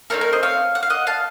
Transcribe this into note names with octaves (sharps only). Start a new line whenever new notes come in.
A3 C4 D#4 A#4 C#5
A#4
C5 D#5
C#5 F5
F#5
F5
D#5 F#5
F5 A5